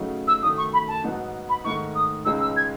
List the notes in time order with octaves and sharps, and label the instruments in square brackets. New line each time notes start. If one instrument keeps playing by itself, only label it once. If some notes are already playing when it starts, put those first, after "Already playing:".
Already playing: [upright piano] C#3 F#3 A3 D#4
[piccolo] E6
[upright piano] F#2 D#3 A3 [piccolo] D#6
[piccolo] C#6
B5
A5
[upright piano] G#2 F#3 B3 D#4
[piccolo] B5
[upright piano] G#2 D#3 A3 D#4 [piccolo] C#6
[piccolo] D#6
[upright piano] C#2 C#3 G#3 D#4 [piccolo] E6
[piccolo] E6
G#6